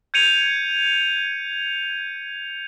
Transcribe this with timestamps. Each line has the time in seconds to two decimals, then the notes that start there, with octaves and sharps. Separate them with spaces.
0.14 G6 G#6 C#7 D#7 F7